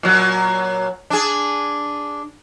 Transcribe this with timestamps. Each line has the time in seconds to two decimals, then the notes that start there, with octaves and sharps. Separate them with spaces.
0.03 A#2 F#3
1.10 D4 G#4